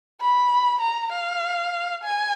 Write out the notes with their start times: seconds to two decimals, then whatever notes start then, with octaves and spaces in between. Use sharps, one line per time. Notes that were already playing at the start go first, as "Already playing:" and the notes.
0.21 B5
0.81 A#5
1.12 F5
2.03 G#5